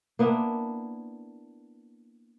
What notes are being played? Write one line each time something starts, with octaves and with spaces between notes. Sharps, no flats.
A#3 B3 D4 E4